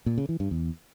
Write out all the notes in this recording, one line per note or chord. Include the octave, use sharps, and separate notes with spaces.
A#2
C#3
E3
G2
E2